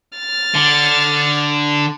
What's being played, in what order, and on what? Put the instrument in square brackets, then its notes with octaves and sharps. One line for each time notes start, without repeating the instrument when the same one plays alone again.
[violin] F6 A6
[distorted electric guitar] D3